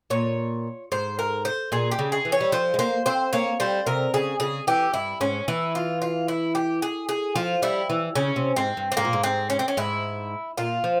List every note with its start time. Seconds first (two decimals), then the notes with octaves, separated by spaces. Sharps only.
0.10 A#2 C#5
0.92 G#2 C5
1.19 A#4
1.45 C5
1.72 A#2 G#4
1.91 G4
1.99 C#3
2.12 G#4
2.25 E3
2.32 C#5
2.41 G3
2.52 F3 C5
2.74 G#3
2.79 A#3 C5
3.06 C4 C5
3.33 A#3 C#5
3.60 G3 C5
3.86 C3 A#4
4.14 C#3 G#4
4.40 C#3 G#4
4.67 E3 G4
4.94 G2 E4
5.21 G#2 C#4
5.48 E3 E4
5.75 F4
6.02 F4
6.28 E4
6.55 G4
6.82 G#4
7.09 G#4
7.35 F3 F4
7.62 G3 E4
7.90 E3
8.15 C#3 C#4
8.36 C3
8.56 G#2 C4
8.77 G2
8.92 C4
8.97 G#2 A#3
9.05 A#2
9.13 G#2
9.24 C4
9.50 C#4
9.59 C4
9.68 C#4
9.77 G#2 E4
10.57 A#2 F4
10.84 F3